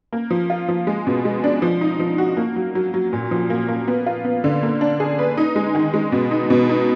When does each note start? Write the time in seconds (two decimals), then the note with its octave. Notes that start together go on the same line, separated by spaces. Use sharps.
0.12 A#3
0.30 F3
0.50 F4
0.68 F3
0.87 G#3
1.07 B2
1.25 G#3
1.44 D4
1.62 F3
1.81 D#4
2.00 F3
2.18 F#4
2.37 A#3
2.56 F#3
2.75 F#3
2.94 F#3
3.13 A#2
3.31 F3
3.50 A#3
3.68 A#3
3.87 B3
4.06 F4
4.25 B3
4.44 D3
4.63 A#3
4.81 D4
5.00 G#4
5.19 B4
5.37 D#4
5.56 G#3
5.75 D#3
5.94 G#3
6.12 B2
6.31 D#4
6.50 B2
6.69 D#4